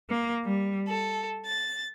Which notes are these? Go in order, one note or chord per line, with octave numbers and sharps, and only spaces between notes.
A#3
G3
A4
A6